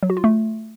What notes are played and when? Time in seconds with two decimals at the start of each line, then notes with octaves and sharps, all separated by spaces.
0.03 F#3
0.10 F#4
0.17 F4
0.24 A3